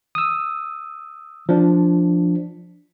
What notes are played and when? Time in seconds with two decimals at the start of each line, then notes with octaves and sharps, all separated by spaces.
0.15 D#6 E6
1.49 F3 D4